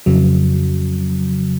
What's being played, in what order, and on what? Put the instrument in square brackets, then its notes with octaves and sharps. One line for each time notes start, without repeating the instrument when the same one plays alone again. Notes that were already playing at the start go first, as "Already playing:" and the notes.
[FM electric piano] F2 C#3 F#3